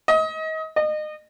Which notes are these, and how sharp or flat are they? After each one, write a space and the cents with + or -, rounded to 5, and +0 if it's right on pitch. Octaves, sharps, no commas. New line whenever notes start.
D#5 +30
D#5 -30